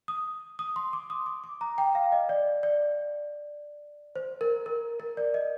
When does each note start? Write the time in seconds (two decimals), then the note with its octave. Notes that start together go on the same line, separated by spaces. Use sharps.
0.08 D#6
0.59 D#6
0.76 C6
0.93 D6
1.10 D#6
1.26 D6
1.44 D6
1.61 A#5
1.78 G5
1.95 F5
2.12 D#5
2.29 D5
2.63 D5
4.15 C5
4.41 A#4
4.66 A#4
5.00 A#4
5.17 D5
5.34 D#5